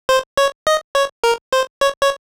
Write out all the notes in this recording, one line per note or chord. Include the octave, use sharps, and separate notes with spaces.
C5
C#5
D#5
C#5
A#4
C5
C#5
C#5